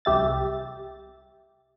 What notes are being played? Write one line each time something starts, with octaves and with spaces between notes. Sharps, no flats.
C2 G4 E5 A6